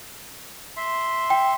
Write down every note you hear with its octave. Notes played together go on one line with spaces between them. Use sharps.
E5 C6
G5